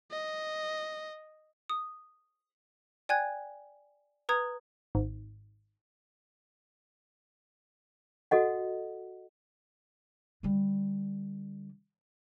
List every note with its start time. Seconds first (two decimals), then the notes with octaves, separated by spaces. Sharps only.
0.11 D#5
1.70 D#6
3.09 D5 G5 G#5 F#6 G#6
4.29 B4 A#5 D#6 G#6
4.95 G#1
8.31 F#4 A4 D#5 F#5
10.43 D3 G3